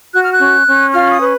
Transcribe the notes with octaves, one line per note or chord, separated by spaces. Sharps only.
F#4 F#6
F6
F#6
C#4
C#4
F4 F6
D#6
B4